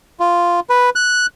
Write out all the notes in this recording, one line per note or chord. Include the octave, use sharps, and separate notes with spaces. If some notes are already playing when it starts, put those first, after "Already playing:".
F4
B4
F#6